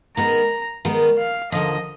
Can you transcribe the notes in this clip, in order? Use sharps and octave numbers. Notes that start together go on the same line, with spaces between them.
D#3 G#3 B3 A#5
D#3 G#3 B3
F5
D#2 D3 F3 D#5